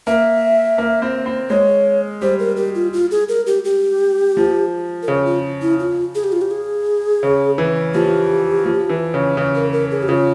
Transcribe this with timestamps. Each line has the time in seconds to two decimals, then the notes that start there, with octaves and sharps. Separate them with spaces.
0.07 A#3 E5
0.78 A#3
1.02 C4
1.26 C4
1.50 G#3 C#5
2.22 G3 C5
2.40 A#4
2.57 G4
2.75 F4
2.93 F4
3.11 G#4
3.29 A#4
3.47 G4
3.65 G4
4.37 F3
5.03 A#4
5.08 C#3 G#4
5.26 F4
5.62 E4
5.80 F4
6.15 G#4
6.24 G4
6.32 F4
6.42 G4
6.51 G#4
7.23 C#3
7.58 E3
7.94 F3 G4
8.66 F3
8.89 E3
9.14 C#3
9.37 C#3
9.55 A#4
9.73 A#4
9.91 G#4
10.03 G4
10.09 C#3 F4